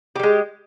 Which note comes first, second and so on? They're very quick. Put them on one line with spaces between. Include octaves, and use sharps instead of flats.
G4 G3 G#3